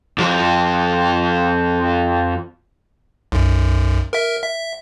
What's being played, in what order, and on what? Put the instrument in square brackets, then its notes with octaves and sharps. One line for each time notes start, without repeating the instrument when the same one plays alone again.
[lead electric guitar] F2 F3
[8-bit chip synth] B1 F#2
A#4 E5
E5